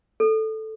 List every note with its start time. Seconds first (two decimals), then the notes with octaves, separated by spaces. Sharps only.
0.20 A4